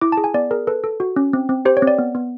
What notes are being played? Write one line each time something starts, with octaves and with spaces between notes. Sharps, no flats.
E4 D6
A5
G#4
G#5
B3 D5
G#4 A#4
A4 B4
A4
F#4
C#4
C4
C4
G4 C5
C#5
C4
D5
B3
B3